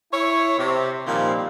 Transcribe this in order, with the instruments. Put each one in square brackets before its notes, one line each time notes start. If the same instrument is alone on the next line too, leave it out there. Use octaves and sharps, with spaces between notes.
[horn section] E4 C#5
C3
A#2 D#3 F3 G3 A#3 C4